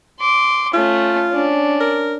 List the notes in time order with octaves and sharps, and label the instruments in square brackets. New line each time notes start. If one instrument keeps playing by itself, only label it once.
[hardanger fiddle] C6 D6
[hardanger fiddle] A3 C#4 [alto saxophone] F4
[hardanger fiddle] C#4 D4
[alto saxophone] A#4